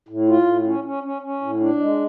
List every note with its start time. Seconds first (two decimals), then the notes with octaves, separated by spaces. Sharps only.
0.09 A2
0.28 F4
0.46 A2
0.65 C#4
0.84 C#4
1.03 C#4
1.22 C#4
1.41 A2
1.60 D4
1.80 G#3